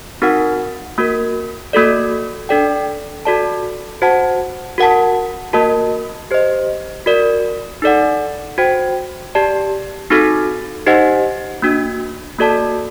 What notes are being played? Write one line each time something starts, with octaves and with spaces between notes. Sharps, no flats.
C4 D#4 F#4 A#4 F#5
A#3 F#4 A#4
A#3 F#4 A4 D5
D4 A4 D5 G5
F#4 A4 D5 A5
F#4 C5 F#5 A5
F#4 A#4 F#5 A5
A#3 F#4 A#4 D#5 A5
G4 C5 D#5
F#4 A#4 D5
D#4 A4 D5 F#5
F#4 C5 G5
G4 D5 A5
C4 D#4 F#4 A4
D#4 G4 C5 D#5 F#5
A#3 D4 F#4
A#3 F#4 A4 D5 A5